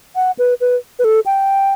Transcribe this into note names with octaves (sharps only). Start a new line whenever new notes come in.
F#5
B4
B4
B4
A4
G5